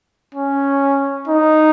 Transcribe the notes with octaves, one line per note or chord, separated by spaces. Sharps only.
C#4
D#4